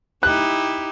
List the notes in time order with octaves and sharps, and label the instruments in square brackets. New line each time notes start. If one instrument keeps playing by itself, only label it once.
[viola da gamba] D#4 E4 G4 [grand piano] F#6